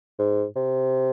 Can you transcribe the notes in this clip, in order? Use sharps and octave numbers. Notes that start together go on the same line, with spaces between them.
G#2
C3